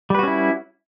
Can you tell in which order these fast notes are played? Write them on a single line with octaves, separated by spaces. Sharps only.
G3 B4 F#4 C#4 E4